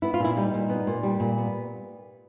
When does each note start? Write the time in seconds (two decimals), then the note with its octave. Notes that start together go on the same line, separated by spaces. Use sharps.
0.02 B3 E4
0.14 F4
0.19 A#2
0.25 E4
0.37 G3 D#4
0.54 A#2
0.69 B3
0.87 A#2
1.03 G3
1.20 A#2
1.38 B3